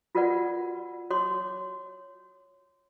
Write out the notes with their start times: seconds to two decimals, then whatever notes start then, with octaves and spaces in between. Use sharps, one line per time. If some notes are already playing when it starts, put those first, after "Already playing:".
0.15 F4 F#4 A#4 B4 D5 F#5
1.10 F#4 C#5 C6 D6